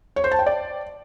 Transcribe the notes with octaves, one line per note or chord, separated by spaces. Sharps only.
C#5
C5
A5
G5
D5